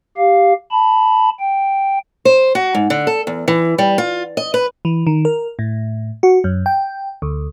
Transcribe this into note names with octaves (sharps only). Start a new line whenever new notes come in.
G4 F5
A5 B5
G5
C5
F#4
G#2
D3
A4
E2
E3
G3
F4
D#5
B4
E3
D#3
A#4
A2
F#4
F#2
G5
D2